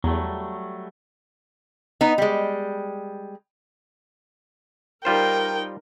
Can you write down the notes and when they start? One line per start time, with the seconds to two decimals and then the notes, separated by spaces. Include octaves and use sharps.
0.04 E2 F#3 G3 A3
2.01 B3 D#4
2.18 G3 G#3
5.05 G3 D#4 F4 A#4 C5 G5